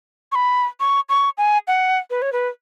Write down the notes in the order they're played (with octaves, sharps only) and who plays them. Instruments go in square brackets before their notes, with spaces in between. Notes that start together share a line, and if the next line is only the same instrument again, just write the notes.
[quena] C#6
B5
C#6
C#6
G#5
F#5
B4
C#5
B4